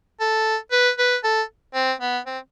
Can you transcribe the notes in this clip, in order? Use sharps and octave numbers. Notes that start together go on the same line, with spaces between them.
A4
B4
B4
A4
C4
B3
C4